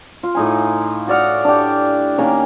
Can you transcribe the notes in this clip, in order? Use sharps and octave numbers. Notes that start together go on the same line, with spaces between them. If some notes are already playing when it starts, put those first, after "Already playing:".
F4
A2 D#4 G#5
F#4 D5 F5 F#5
D4 G4
D#3 A#3 C#4